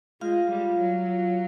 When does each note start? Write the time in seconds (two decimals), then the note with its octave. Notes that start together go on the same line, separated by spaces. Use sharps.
0.21 G#3 F4 F5
0.51 G3
0.79 F#3